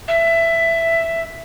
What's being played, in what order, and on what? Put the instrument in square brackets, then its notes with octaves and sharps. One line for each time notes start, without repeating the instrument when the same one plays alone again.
[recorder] E5